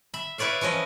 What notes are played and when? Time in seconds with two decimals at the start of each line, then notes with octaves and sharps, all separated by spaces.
0.14 E5 B5
0.38 E4 B4 C#5 D5 F5
0.61 E3 F3 C#4 D#5